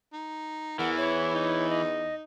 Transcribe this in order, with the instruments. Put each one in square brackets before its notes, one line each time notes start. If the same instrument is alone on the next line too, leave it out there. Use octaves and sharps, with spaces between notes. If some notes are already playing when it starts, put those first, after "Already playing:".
[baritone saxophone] D#4
[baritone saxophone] E2 [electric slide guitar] E3 [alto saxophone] A#4 [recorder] F#5
[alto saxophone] E4 [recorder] C#5
[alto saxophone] D#4
[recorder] D#5